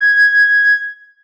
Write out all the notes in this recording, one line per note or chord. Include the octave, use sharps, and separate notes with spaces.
G#6